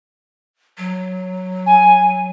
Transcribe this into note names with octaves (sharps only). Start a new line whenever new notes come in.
F#3
G#5